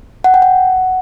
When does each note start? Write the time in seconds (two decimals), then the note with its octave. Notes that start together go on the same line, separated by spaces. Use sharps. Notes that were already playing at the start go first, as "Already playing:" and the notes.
0.24 F#5
0.34 G5
0.42 F#5